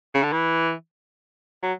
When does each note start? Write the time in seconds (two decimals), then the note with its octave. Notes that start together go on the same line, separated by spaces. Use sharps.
0.15 C#3
0.23 D3
0.33 E3
1.63 F#3